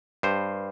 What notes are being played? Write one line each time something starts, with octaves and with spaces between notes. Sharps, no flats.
G2 C5